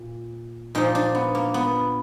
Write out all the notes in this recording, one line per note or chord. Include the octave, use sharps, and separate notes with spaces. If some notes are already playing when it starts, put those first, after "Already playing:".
Already playing: A#2
A#2 F3 D#4
D4
B3
A#3
B3